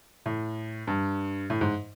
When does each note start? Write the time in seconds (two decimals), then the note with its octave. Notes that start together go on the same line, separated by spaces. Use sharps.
0.26 A2
0.87 G2
1.50 A2
1.61 G#2